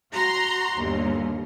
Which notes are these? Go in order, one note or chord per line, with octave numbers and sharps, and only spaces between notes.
F#4 A#5 C6
G1 D#2